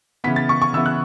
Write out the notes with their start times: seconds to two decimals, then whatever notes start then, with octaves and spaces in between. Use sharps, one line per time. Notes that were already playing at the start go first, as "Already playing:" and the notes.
0.24 C#3 E3 B3 B6
0.36 A6
0.49 C#6
0.62 C#6
0.73 C#3 E3 B3 E6
0.86 F#6